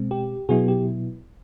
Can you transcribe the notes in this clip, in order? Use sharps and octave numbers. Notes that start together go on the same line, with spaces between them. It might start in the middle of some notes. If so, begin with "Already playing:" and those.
Already playing: B2 G#3 C4
G4
B2 F#3 B3 E4 F#4 G#4
G4